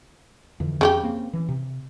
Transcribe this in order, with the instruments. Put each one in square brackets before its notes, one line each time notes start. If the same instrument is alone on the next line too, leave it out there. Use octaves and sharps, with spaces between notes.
[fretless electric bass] F2 D3 E3
[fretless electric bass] F2 [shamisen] C#3 F#4 G4
[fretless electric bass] A#3 C4
E3
C3